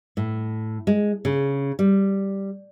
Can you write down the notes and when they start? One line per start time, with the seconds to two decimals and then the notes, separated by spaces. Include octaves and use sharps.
0.17 A2
0.87 G#3
1.25 C#3
1.79 G3